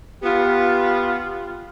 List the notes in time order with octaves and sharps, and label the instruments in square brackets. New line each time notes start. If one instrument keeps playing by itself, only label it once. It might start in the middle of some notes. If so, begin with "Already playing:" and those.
[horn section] B3 [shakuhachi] F4 [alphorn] G4